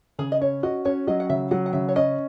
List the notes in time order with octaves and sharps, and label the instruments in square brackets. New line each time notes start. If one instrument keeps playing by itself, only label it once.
[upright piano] C#3 [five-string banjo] G#4
[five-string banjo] D#5
[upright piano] C#4 [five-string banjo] C#5
[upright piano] F#4 [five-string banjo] D#5
[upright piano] C#4 [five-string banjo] C#5
[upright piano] F#3 [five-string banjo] D#5
[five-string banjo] F#5
[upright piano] C#3 [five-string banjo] E5
[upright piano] F#3 [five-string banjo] F#5
[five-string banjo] F#5
[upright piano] C#3 [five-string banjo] E5
[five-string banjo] C#5
[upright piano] C#4 [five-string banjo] D#5